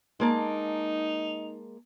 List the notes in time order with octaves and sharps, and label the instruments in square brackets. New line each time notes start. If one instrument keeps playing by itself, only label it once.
[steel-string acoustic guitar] G#3 A#3 A5 [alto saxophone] D#4